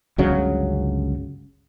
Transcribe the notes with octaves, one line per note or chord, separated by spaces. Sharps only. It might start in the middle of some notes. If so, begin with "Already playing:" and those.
G1 C#2 C#3 F#3